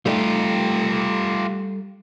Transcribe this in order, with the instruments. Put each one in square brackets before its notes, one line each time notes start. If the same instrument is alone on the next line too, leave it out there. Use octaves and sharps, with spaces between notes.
[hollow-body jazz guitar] G3 A3 D#4 [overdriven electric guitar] F4 G4